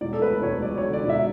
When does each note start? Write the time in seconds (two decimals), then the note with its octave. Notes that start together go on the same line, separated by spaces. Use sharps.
0.01 E1 D5
0.13 A4
0.22 D2 B4
0.42 E1 C#5
0.62 F#3 D5
0.78 C#5
0.84 D3
0.93 D5
1.04 E1
1.09 E5